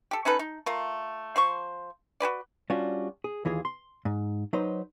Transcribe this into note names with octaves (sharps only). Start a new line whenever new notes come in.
G4 A4
C#4 D#4 A4 B4
D#4
A3 F4 A#4
F3 C5 C#6
F#4 G4 B4 D5
G3 C#4 D4 F4 F#4
G#4
D#2 E3 F4 G#4
C6
G#2
F#3 D#4 B4 C5